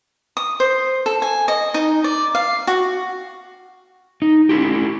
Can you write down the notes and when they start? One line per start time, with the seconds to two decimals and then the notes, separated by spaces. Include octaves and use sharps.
0.37 D#6
0.60 C5
1.06 A4
1.22 G#5
1.48 D#5
1.74 D#4
2.04 D5
2.35 F5
2.67 F#4
4.22 D#4
4.49 C#4 E4 G4